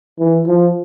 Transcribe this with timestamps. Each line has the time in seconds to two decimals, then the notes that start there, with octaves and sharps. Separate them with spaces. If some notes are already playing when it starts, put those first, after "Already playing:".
0.19 E3
0.47 F3